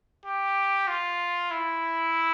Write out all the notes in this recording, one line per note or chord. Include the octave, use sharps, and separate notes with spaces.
G4
F4
E4